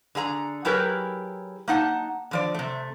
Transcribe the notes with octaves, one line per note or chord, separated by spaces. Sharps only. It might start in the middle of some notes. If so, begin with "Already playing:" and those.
D3 G#4 E5 A#5
F#3 E4 G4 G#4 A#4 B4
A#3 D#4 F#5 A5
D3 F3 D5
C3 A3